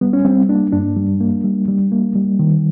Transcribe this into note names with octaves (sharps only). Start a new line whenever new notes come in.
G3 B3
C#4
G3 C4
A#3 D4
G2 D4
G3
A#3
G3
G3
A#3
G3
D#3